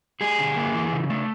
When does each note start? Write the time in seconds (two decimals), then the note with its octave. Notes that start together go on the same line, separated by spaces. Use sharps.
0.21 G3 G#4
0.39 D3
0.57 A#3
0.75 E3
0.92 C#3
1.10 A3